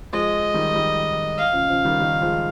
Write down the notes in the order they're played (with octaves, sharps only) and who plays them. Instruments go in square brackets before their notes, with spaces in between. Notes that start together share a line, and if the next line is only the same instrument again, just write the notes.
[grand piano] F3 G#3 [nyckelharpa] D#5
[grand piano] D#3 G3
D#3 G3
[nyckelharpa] F5
[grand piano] C#3 F3
C#3 F3
D#3 G3
D#3 G3
F3 G#3